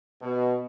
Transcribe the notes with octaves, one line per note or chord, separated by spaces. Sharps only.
B2